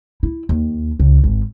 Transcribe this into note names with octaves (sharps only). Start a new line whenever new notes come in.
E4
D#2
C#2
G#1